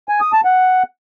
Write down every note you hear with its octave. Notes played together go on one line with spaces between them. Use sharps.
G#5
D#6
A5
F#5